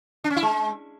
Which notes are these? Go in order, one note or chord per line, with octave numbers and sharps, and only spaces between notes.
D4
C#4
E4
G#3